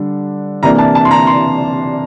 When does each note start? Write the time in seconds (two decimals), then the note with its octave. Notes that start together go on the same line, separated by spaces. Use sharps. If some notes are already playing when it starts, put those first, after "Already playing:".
Already playing: D3 G3 D4
0.63 C3 E3 A#3 D4 A#5
0.78 A5
0.95 A5
1.05 C6
1.11 A#5
1.27 C6